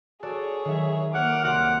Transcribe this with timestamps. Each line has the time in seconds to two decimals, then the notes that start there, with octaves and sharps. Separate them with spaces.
0.23 F#4 G#4 A4 C#5 D5
0.65 D#3 F#3 E5
1.14 A#3 C#5 F#5 D6 F6
1.44 C2 F#5 C6